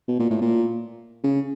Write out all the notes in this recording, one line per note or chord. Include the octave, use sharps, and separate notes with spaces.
B2
A#2
A2
A#2
C#3